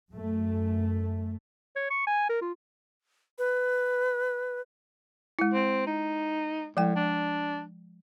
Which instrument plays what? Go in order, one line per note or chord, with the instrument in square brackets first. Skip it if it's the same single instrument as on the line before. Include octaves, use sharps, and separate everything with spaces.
[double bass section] F#2 A3
[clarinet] C#5
C#6
G#5
A#4
F4
[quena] B4
[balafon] G#3 E4
[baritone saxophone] C4
D#4
[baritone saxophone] A2 [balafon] F3 G#3 G5
[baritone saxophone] D4